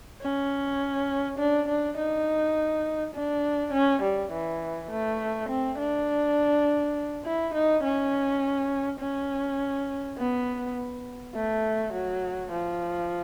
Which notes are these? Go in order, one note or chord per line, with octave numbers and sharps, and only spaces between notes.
C#4
D4
D4
D#4
D4
C#4
G3
E3
A3
C4
D4
E4
D#4
C#4
C#4
B3
A3
F#3
F3